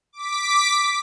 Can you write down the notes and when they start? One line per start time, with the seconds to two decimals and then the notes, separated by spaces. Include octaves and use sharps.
0.13 D6 B6